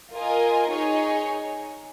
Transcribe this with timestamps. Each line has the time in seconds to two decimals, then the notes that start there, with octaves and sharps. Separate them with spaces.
0.13 F4 A#4 D#5 G#5
0.70 D#4 G#4 C#5 G#5